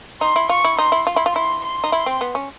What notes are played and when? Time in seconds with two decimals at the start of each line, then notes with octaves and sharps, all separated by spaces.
0.21 D#4 C6
0.36 E4
0.49 F4 C#6
0.64 E4
0.78 D#4 C6
0.92 E4
1.07 F4 C6
1.16 E4
1.26 F4
1.35 E4 C6
1.64 C6
1.84 D#4
1.92 E4
2.06 C4
2.21 B3
2.35 C#4